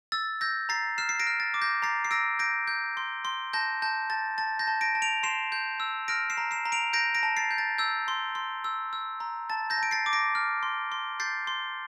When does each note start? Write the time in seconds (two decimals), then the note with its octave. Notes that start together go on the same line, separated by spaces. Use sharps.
0.12 E6 A6
0.41 E6 G6 A#6
0.69 A#5 A6 C7
0.98 F6 C7 E7
1.09 C7
1.19 A#6 D7
1.27 F6
1.40 A6
1.54 D6
1.62 G6 A#6
1.82 A#5 A6 C7
2.05 C7
2.11 E6 A#6 D7
2.39 G6 A#6 D7
2.67 G6
2.97 C6
3.25 C6
3.53 A5 G6 A#6
3.82 A5 G6
4.10 A5 A6
4.38 A5 A6
4.59 G6 A#6
4.67 A5
4.81 A#6 D7
4.95 A5
5.02 D7 F7
5.23 C6 C7 E7
5.52 G6
5.80 E6
6.08 F6 A#6 D7
6.30 C7 E7
6.37 A#5
6.51 C7 E7
6.65 A#5
6.72 D7 F7
6.93 G6 A#6 D7
7.15 A#6 D7
7.23 A5
7.37 A6 C7
7.51 G6
7.58 A6
7.78 E6 G6
8.08 C6
8.35 C6
8.64 E6
8.93 E6
9.20 A#5
9.50 A5 A6
9.70 G6 A#6
9.78 A5 D7
9.91 A6 C7
10.06 D6
10.13 A#6 D7
10.35 F6
10.63 C6
10.92 C6
11.20 G6 A6 C7
11.47 C6